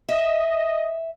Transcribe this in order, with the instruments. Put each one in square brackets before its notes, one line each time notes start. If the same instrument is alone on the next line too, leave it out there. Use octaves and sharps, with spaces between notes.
[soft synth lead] D#5 [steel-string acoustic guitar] E5